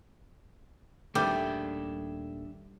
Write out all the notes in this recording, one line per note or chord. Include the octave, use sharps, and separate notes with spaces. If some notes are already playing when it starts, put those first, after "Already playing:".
D#1 D#3 G3 A3 D4 E5 G5